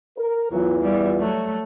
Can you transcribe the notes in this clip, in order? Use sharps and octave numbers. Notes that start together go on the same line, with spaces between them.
A#4
E2 E3 F#3 F4
G3 E4
F#3 A3